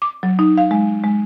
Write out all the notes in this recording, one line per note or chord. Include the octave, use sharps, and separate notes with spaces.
D6
F#3
D#4
F5
G#3
G#3